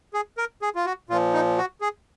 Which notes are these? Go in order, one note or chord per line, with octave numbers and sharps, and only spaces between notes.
G#4
A#4
G#4
F4
F#4
A#2 F3 F4
D#4
F#4
G#4